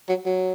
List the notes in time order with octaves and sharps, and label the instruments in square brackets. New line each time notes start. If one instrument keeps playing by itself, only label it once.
[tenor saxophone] F#3
F#3